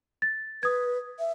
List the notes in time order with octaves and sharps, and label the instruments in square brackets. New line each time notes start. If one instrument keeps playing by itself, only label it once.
[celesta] A6
[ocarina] B4 [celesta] D#6 G#6
[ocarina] E5